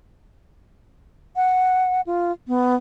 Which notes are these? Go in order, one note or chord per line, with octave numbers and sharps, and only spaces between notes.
F#5
F4
B3